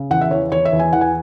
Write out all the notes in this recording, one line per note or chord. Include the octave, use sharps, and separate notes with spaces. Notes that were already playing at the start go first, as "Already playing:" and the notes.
Already playing: C#3
E2 F#5
E5
E2 C#5
E2 C#5
E5
E2
G#5
E3 F#5
G#5